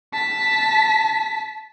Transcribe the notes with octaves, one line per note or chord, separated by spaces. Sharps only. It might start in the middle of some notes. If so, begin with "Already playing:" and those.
A5 B6